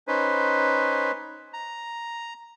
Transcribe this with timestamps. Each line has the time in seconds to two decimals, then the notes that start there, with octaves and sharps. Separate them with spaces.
0.08 C#4 D#4 B4 C5
1.53 A#5